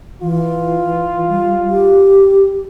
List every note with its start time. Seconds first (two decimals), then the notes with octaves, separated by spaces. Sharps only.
0.22 E3 F4
1.29 G3
1.70 G4